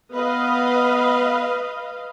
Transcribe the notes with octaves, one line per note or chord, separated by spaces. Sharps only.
B3 B4 D#5 F5